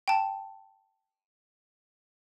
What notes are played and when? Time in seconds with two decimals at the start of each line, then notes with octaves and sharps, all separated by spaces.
0.08 G5 A5